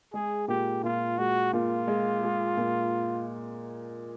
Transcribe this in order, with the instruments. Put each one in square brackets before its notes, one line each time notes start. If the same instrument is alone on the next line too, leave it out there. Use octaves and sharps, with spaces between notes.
[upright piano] G#3 [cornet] G#4
[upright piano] A#2 [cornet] G4
[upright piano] A#2 [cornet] F4
[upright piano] G#3 [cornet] F#4
[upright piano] A#2 [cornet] F4
[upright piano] G#3
G#3
A#2